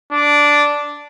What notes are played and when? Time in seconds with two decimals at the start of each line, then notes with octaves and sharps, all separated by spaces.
0.12 D4